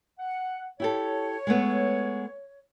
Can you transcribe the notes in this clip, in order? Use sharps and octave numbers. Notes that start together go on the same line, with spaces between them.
F#5
E4 G4 A4 C#5
G#3 A3 B3